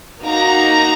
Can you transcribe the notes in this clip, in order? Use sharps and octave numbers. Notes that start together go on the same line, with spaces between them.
A#3 D#4 F#4 A#5